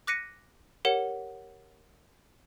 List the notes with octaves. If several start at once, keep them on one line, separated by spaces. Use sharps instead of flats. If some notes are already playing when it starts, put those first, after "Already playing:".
D6 F#6 A#6 B6 C#7 D#7
G4 A#4 C#5 F#5 C#7